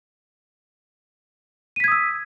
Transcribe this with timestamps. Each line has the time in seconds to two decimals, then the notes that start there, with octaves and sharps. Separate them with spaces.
1.76 D#7
1.80 B6
1.84 G#6
1.88 D#6
1.92 E6